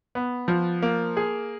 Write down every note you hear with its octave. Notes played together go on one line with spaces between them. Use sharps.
B3
F3
A#3
G#4